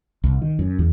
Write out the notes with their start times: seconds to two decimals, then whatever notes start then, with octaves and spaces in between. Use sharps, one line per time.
0.24 C2
0.42 D#3
0.59 F#2
0.79 E2